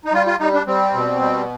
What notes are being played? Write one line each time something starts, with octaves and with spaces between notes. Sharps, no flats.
D#4
G3 F4
F4
G3 D#4
D4
G3 C4
B2
G3